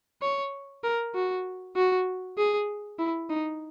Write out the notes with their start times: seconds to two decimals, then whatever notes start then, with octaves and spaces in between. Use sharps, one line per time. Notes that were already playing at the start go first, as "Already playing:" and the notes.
0.22 C#5
0.84 A#4
1.15 F#4
1.77 F#4
2.38 G#4
2.99 E4
3.30 D#4